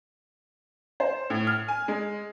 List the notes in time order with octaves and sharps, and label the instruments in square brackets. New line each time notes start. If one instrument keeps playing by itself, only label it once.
[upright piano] C5
A2
F6
G#5
G#3